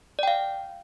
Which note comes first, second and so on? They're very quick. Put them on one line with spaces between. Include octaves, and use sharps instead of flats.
D5 G5 F5